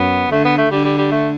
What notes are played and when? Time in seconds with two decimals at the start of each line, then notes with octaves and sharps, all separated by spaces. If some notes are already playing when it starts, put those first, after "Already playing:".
Already playing: F#2 B3
0.31 D3 A3
0.45 B3
0.58 A3
0.71 D3 G3
0.84 G3
0.98 G3
1.11 A3